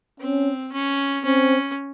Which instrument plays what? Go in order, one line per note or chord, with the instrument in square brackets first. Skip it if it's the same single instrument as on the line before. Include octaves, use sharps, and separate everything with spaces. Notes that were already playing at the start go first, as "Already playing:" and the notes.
[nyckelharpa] C4 [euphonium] C#4
[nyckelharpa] C#4
[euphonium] C4 [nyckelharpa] C#4